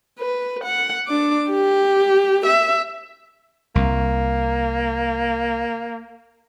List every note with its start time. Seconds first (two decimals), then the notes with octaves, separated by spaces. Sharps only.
0.19 B4
0.64 F#5
1.07 D4 D6
1.50 G4
2.46 E5
3.75 C2 A#3